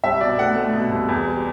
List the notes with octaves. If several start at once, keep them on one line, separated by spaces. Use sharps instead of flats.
C2 E5
B2 D5
A3 F#5
A3
B2
C2
E2
G3